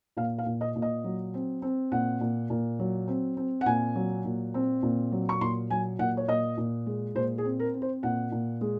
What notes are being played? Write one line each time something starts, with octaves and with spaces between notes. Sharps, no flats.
A#2 F5
F5
A#2
D#5
A#2
D#5
F#3
C4
C4
A#2 F#5
A#2
A#2
F#3
C4
C4
F#5
A#2 G#5
F#3
A#2
C4
A#2
F#3
C#6
A#2 C6
F#3 G#5
A#2 F#5
C#5
A#2 D#5
A#2
G#3
A#2 C5
G#4
C4
A#4
C4
C5
A#2 F#5
A#2
G#3